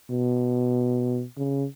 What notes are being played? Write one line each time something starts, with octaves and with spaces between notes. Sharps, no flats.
B2
C#3